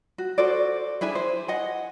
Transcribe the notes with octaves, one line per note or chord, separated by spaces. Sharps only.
F#4
F#4 A4 C5 D5
D4 E4 G#4 G#5
C5
D#5 F#5 G#5